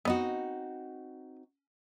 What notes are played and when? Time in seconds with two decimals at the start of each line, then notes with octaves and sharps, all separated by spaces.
0.05 B3 C4 D#4 F#4 D#5